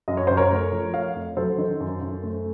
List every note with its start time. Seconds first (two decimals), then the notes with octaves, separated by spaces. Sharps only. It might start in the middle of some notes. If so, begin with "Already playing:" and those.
0.08 F#2 D#5
0.17 C#5
0.27 F#2 C5
0.37 A#4 C#5
0.51 A3
0.72 F3
0.93 A3 C#5 F5
1.16 F2
1.37 F#3 A4 C5
1.58 D#3
1.80 F#2
2.01 F#2
2.23 A3